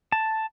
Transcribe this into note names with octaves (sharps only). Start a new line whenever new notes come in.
A5